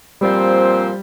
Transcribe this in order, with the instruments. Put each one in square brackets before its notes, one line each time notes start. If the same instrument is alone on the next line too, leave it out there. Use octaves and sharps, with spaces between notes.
[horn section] A#2 F3 C4 [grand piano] G3